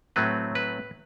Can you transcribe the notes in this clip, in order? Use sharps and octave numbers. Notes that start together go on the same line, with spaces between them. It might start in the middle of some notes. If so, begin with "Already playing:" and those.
A2 F#3 A3 C4 B4
B4